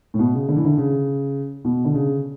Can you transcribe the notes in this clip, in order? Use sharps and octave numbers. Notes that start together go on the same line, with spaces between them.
A2
B2
C#3
D3
E3
D3
C#3
B2
D3
C#3